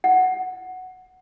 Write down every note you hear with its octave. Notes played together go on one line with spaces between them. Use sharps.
F#5